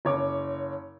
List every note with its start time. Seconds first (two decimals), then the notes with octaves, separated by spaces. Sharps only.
0.05 F#1 C#5 D6